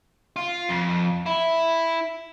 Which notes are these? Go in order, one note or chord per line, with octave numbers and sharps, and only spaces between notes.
F4
F2
E4